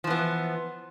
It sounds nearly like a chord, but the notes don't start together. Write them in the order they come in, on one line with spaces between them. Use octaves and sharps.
F3 E3 B3